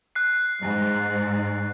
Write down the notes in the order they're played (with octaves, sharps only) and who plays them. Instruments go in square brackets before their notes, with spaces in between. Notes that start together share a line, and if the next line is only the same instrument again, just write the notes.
[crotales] F#6 C7
[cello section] G#2